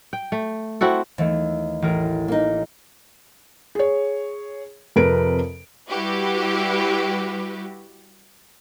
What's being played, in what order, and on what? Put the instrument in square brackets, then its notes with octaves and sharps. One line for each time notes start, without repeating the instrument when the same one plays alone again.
[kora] G5
A3
C4 E4 F#4 A4
[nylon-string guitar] D#2 [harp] E3 A3
[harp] A1 A#4
[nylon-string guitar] A#3 D#4
[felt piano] G#4 C#5
F2 C3 A#4 B4 D7
[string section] G3 E4 F#4 G4 B4